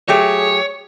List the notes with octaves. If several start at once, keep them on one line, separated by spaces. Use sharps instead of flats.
F#3 A3 G4 G#4 C#5